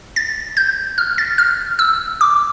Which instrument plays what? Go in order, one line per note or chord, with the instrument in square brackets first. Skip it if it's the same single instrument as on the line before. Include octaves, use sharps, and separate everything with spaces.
[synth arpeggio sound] A6
G6
F6
A6
F6
E6
D6